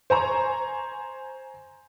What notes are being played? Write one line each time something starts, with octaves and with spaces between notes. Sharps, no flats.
C5 G#5 A#5 C#6